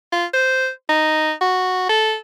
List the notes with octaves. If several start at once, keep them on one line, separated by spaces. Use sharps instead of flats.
F4
C5
D#4
F#4
A4